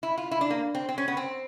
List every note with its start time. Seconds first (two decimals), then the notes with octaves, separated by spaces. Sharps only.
0.03 E4
0.18 F4
0.31 E4
0.41 D4
0.50 A#3
0.75 C4
0.89 C4
0.98 C#4
1.08 B3
1.17 C4